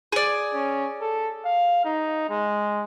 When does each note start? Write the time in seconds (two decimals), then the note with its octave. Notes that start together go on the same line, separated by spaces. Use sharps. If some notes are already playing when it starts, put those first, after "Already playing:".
0.12 G#4 D5
0.54 C#4
1.01 A4
1.45 F5
1.85 D#4
2.29 G#3